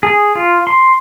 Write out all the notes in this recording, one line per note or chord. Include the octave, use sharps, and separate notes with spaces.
G#4
F4
C6